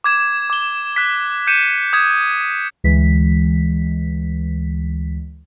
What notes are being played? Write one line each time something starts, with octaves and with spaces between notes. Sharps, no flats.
D6 G#6 E7
D6 G7
F#6 B6
G6 C#7 D#7 E7
D#6 G#6 E7
D2 E3 G#3 B6